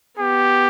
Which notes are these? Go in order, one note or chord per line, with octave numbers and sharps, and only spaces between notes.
B3 G4